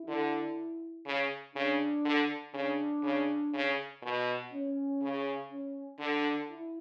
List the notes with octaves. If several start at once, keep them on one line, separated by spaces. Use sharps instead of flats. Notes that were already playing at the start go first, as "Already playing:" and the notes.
Already playing: E4
D3
C#3
C#3 D4
D3
C#3 D4
C#3
C#3
B2
C#4
C#3
C#4
D3 D4
E4